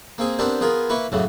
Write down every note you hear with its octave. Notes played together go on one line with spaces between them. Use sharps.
A#3 C4 G#4
B3 C4 D4 G4 A#4
B3 F4 G#4 A#4
A#3 E4 B4 C#6
F#2 A2 C#3 E3